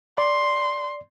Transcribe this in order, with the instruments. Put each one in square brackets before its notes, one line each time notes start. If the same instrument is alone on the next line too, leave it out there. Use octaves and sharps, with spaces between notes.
[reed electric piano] D5 [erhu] C6